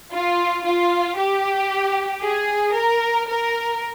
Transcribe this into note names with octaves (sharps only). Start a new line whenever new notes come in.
F4
F4
G4
G#4
A#4
A#4